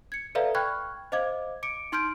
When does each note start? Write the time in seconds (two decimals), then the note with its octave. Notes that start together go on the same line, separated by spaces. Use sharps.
0.12 G#6 C#7
0.35 A4 B4 D5 E5 F5 A#5
0.55 G5 B5 C#6 F6 F#6 G#6
1.12 C5 D#5 F5 D6 G#6
1.63 D6 C#7 D7
1.92 D#4 C6 F6 G6 D7